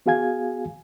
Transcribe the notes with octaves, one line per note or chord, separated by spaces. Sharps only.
B3 F#4 G#4 F5 G#5 G#6